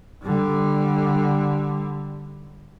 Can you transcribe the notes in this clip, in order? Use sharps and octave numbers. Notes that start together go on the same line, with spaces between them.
D3 G3